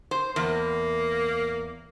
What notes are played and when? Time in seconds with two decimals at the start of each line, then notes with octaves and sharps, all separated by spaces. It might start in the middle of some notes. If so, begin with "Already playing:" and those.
0.11 C5
0.36 E2 A#3